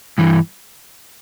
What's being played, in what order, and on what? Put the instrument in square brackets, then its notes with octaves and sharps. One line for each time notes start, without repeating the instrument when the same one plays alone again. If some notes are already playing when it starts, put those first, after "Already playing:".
[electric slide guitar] G2 E3